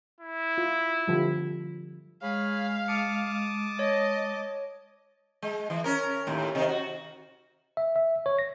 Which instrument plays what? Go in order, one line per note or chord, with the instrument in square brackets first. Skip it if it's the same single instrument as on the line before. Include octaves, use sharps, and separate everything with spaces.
[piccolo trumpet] E4
[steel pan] F4
D3 F3 G3
[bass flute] G#3 [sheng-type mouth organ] G#4 C#5 B5 [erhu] F5
[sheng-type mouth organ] A5 D6 D#6 [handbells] C#7
[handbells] C#5 [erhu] D#5
[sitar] G#3
E3
C#4 A#4
D#2 A2
C3 D#3 D#4
F#4
[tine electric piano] E5
E5
C#5
A#6